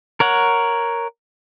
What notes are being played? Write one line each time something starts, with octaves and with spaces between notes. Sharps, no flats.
A#4 C#5 F#5